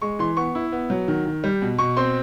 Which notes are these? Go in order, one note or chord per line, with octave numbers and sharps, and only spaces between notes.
G#3 C#6
E3 C6
B3 C#6
E4
B3
F#3
D#3
D#3
G3
B2
B2 C#6
C4 C6